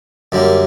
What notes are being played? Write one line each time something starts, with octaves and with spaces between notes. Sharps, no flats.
F#2 D3 G3 A#3